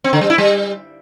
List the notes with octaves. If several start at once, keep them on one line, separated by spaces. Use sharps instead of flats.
C4
D3
G3
E4
G3